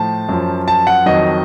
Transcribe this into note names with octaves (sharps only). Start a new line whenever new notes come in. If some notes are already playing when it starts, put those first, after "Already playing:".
Already playing: A2 F3 A5
F#2 F3
A5
F#5
F2 D#3 F#3 D#5